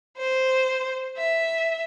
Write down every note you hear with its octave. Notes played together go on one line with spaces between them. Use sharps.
C5
E5